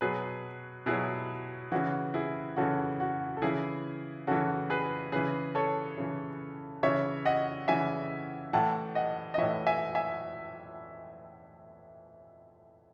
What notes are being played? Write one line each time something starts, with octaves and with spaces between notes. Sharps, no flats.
B2 F#3 G#4 B4
B2 F#3 E4 G#4
C#3 E3 F#4
E4 G#4
C#3 E3 F#4 A4
F#4
A4
C#3 E3 E4 G#4
C#3 E3 F#4 A4
G#4 B4
C#3 E3 G#4 B4
A4 C#5
C#3 E3
C#3 E3 C#5 E5
D#5 F#5
C#3 E3 E5 G#5
A2 E3 F#5 A5
D#5 F#5
D#5
A2 E3 C#5 E5
E5 G#5
E5 G#5